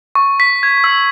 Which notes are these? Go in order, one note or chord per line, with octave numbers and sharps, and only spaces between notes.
C#6
B6
G#6
E6